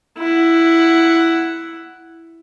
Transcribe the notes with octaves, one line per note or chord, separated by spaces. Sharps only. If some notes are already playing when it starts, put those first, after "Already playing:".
E4 F#5